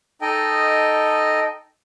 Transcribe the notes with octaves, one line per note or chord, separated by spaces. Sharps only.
D#4 A4 D#5 G5